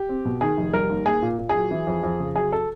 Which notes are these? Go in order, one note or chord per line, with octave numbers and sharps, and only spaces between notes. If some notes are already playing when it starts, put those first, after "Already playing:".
Already playing: G4
C4
B2
D#3 G#4
F1
G3 A#4
D#2
A#3 G#4
A#2
A#2
F#3 G#4
E3
F2
F2
C#3
F#3 G#4
A4